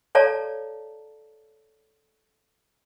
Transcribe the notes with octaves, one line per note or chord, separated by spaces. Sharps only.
A4 C#5 D5 F5 A5 A#5